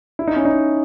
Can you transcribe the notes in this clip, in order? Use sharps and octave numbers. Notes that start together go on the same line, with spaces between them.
E4
D#4
C#4
D#4